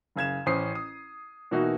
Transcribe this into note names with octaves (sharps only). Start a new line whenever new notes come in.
F#1 C#3 G#6 E7
A1 C#4 C5 D#6 C7
D#6
B2 E3 A#3 D#4 E4 F#4